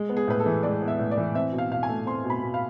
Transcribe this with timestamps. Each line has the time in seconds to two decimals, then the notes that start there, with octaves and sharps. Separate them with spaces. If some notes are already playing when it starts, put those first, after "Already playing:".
Already playing: G#3
0.09 B3
0.17 G#4
0.28 A2 B4
0.40 A4
0.46 E3
0.63 G#3 D5
0.82 B3
0.88 E5
0.99 A2
1.11 D5
1.17 E3
1.35 C4 E5
1.52 B2
1.58 F5
1.70 B2 F5
1.83 G#5
1.89 A3
2.06 C4 C6
2.25 B2
2.30 B5
2.42 B2
2.54 F5